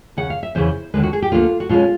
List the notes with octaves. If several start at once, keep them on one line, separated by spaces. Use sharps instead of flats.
D#2 C#3 F#5
F5
E5
E2 C#3 E3 C5
D#2 D3 F3 G#3 B4
F#4
G#4
G4
D2 D3 G3 A#3 F4
F#4
B2 G#3 C#4 F4